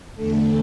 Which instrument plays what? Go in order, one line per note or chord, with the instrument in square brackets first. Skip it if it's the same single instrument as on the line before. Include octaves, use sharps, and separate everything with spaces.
[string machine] E2 D3 A3 A4